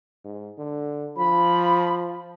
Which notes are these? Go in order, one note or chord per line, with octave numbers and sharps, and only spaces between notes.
G#2
D3
F3 B5